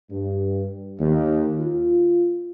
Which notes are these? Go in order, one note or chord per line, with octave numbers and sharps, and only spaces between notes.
G2
D#2
F4